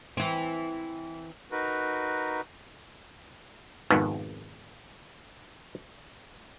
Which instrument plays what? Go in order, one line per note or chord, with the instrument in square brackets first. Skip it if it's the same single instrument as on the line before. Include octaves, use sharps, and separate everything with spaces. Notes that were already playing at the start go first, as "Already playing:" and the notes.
[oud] E3 C4
[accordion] D#4 F#4 A#4 B4
[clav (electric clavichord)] G#1 F2 G#2 B2 D#3 B3